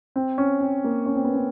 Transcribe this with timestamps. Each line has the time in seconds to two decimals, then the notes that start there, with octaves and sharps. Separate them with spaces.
0.16 C4
0.38 C#4
0.61 C4
0.84 A#3
1.06 C#4
1.15 C4
1.24 B3
1.34 C4